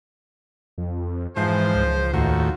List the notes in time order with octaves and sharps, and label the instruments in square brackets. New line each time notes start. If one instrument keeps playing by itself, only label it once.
[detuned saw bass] F2
[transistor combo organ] G#2 [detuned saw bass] E3 [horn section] F3 C5
[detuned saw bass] C#2
[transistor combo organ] D#2 A2 [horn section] D#4 F4 F#4